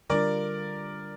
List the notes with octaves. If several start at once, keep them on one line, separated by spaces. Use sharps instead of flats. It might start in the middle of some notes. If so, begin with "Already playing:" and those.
D3 G3 D4 F4 A#4 D5